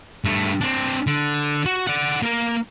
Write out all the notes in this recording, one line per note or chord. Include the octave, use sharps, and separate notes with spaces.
G2 A3
C4 D4
D3
F#4
D5 F#5
A#3 A#4